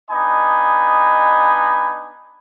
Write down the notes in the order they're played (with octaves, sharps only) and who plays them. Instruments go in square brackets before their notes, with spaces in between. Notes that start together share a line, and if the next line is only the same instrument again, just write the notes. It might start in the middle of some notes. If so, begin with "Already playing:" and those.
[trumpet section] B3 D4 D#4 D#5 G#5 B5